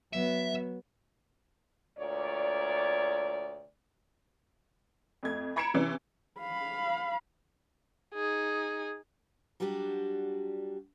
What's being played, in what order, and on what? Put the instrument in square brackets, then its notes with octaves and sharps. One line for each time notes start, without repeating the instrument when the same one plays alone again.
[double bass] F#3 B3 [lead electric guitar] E5
[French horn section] D2 A#2 C#5 D5
[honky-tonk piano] F2 A3 G#6
A#5 B5 G#6 C#7 D7 E7
C3 E3 C#4
[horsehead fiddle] F5 B5
[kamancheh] D#4 G#4
[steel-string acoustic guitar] F#3 G3 D4 F#4 G4